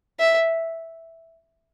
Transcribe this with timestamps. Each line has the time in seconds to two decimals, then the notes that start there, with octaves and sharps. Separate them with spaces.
0.19 E5